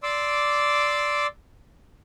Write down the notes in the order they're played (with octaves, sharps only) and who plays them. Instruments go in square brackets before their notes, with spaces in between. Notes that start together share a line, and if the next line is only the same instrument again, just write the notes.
[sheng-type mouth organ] D5 C6 D6 E6